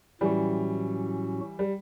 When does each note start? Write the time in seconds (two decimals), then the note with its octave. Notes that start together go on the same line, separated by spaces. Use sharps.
0.21 A2 E3 F#3 G3 C#4 F#4
1.59 G3